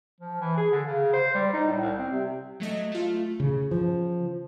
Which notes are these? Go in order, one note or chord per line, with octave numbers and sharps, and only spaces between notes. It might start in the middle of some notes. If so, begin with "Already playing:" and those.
F3
E3
G#4
D3
C#3
C5
G3
D#4
A2
C2
C4
C3
F#3 A3 D#5
A3 F4
C#3
F3